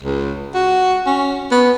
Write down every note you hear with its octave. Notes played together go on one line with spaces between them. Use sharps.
C#2
F#4
C#4
B3